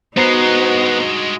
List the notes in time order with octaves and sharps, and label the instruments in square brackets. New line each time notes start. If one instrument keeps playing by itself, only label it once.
[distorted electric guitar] G2 G#3 [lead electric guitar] B3 [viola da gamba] D#4 F#4 [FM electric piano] C5 A#5 C7